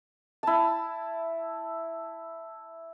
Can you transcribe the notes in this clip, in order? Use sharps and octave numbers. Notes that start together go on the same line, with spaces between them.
E4 A5